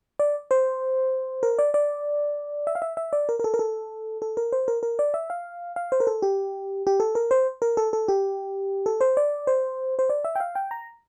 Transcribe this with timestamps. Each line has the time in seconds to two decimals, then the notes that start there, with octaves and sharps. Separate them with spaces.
0.19 D5
0.51 C5
1.43 A#4
1.59 D5
1.74 D5
2.67 E5
2.75 F5
2.82 E5
2.97 E5
3.13 D5
3.29 A#4
3.40 A#4
3.44 A4
3.54 A#4
3.59 A4
4.22 A4
4.37 A#4
4.52 C5
4.68 A#4
4.83 A#4
4.99 D5
5.14 E5
5.30 F5
5.76 F5
5.92 C5
6.00 A#4
6.07 A4
6.22 G4
6.87 G4
7.00 A4
7.15 A#4
7.31 C5
7.62 A#4
7.77 A4
7.93 A4
8.08 G4
8.86 A4
9.01 C5
9.17 D5
9.47 C5
9.99 C5
10.10 D5
10.25 E5
10.35 G5
10.40 F5
10.55 G5
10.71 A#5